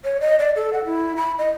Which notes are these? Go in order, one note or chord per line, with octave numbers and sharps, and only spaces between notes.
C#5
D#5
D5
A4
F#5
E4
B5
D#5